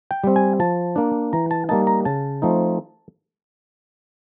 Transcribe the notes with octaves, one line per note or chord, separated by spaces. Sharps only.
G5
G3 C4
G#5
F3 A5
A#3 D4
E3 A#5
A5
G3 A#3 D#4 A5
A#5
C#3 A5
F3 A3 C4 D#4